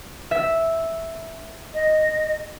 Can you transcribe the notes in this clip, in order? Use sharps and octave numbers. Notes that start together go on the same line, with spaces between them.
E5
D#5